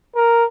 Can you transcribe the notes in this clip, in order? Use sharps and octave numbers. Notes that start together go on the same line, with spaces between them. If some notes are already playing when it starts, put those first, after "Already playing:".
A#4